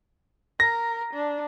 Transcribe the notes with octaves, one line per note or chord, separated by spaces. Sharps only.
A#4 A#6
D4